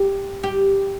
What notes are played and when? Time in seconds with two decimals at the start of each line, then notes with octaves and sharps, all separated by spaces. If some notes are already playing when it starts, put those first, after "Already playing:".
Already playing: G4
0.43 G4